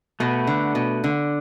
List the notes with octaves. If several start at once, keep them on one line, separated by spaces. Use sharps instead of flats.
B2 A3 F#4 B4
D3
B2
D3